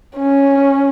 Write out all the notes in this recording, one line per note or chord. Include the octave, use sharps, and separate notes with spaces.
C#4